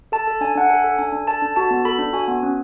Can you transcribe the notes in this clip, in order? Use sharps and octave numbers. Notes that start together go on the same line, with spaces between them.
A4 A5
A4
D4 G#5
D4 F#5
A4 G#5
A4
D4 G#5
D4
A4 A5
D4
F#4 A5
B3
A4 B5
D4
F#4 G#5
B3
C#4